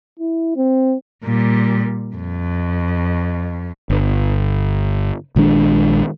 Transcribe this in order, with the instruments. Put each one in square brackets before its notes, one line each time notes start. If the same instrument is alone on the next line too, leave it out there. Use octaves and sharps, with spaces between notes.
[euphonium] E4
C4
[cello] A#2 G3
F2
[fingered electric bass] G1
A#1 D#3 G#3 D4